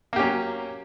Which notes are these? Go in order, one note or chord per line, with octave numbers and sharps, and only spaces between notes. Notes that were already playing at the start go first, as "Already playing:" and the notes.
F#3 A#3 C#4 G4